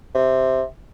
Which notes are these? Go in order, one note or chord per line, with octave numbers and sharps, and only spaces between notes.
C3